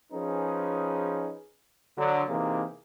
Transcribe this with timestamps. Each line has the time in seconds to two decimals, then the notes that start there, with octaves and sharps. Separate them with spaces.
0.13 F3 C#4 D#4 G#4 B4
1.97 D3 F#3
2.28 C3 E3 A#3 D#4 G#4